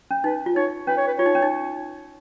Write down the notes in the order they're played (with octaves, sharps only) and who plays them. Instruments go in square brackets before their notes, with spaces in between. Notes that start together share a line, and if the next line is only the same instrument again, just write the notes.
[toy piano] C#4
[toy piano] D#4 [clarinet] B4
[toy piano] F4
[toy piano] D#4 [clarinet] C#5
[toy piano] C#4 [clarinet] B4
[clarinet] C#5
B4
[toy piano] F4 [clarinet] C#5
[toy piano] D#4
C#4
D#4